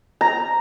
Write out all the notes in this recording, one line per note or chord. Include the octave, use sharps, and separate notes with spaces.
A#5